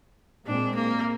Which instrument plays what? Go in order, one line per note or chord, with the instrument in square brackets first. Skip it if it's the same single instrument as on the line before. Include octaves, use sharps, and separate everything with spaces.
[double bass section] A#2 G#3 C4 [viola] D4
[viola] A#3